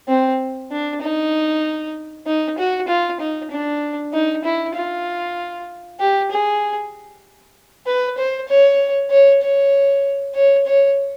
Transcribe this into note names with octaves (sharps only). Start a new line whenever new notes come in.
C4
D4
D#4
D#4
F#4
F4
D#4
D4
D#4
E4
F4
G4
G#4
B4
C5
C#5
C#5
C#5
C#5
C#5